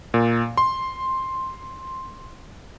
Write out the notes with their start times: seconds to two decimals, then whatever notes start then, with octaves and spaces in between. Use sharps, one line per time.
0.14 A#2
0.57 C6